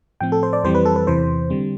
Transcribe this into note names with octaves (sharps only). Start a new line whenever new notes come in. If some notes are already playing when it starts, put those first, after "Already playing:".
A2 F3 C4 G5
A4
C5
D5
F2 E3 G3 C4 C5
B4
A4
B4
E2 C3 E3 C5
D3 G3 C4